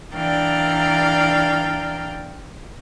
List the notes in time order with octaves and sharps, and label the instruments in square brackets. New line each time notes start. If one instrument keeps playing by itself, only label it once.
[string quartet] E3 D4 D5 F5 G5 A#5